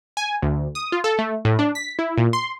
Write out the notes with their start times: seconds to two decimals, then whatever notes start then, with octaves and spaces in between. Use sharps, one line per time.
0.17 G#5
0.42 D2
0.75 D#6
0.92 F4
1.04 A4
1.19 A3
1.45 A2
1.59 D4
1.75 B6
1.99 E4
2.18 A#2
2.33 C6